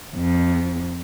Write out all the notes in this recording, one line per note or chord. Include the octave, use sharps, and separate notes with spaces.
F2